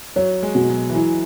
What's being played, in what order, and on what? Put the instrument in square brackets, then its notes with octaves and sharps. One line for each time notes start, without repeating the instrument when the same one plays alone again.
[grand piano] F#3 [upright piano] C#5
[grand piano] G#3
[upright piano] B2
[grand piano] F#3
E3
[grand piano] F#3 [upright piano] E4